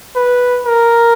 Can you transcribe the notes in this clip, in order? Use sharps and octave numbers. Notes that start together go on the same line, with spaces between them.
B4
A#4